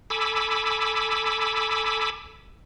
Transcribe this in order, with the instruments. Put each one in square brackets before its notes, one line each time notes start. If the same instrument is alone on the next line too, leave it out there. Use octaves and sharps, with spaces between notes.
[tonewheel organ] A4 G#5 B5 D6 E6